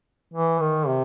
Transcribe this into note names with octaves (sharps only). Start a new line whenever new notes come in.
E3
D#3
C3